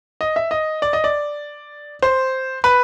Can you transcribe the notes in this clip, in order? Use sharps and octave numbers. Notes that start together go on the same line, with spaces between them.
D#5
E5
D#5
D5
D#5
D5
C5
B4